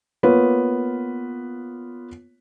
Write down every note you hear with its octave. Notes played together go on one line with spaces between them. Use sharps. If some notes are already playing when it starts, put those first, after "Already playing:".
A#3 B3 F4 B4 C#5